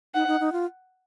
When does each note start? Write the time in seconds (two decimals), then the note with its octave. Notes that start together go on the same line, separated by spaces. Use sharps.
0.15 D#4 F#5
0.27 D#4
0.40 D#4
0.52 F4